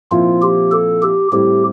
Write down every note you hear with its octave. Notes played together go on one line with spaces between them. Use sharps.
A#2 F3 C4 E4 F4
G4
A4
G4
A2 G3 C4 E4 G4